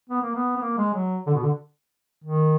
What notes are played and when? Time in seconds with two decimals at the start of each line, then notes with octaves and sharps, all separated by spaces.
0.10 B3
0.22 A#3
0.35 B3
0.57 B3
0.61 A#3
0.78 G#3
0.94 F#3
1.27 D3
1.35 B2
1.43 D3
2.24 D#3